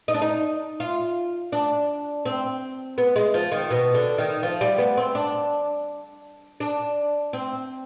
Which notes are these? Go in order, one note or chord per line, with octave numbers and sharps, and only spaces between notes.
D#4
D4
D#4
F4
D4
C4
B3
G#3
F3
D#3
B2
D3
D#3
F3
G3
B3
C4
D4
D4
C4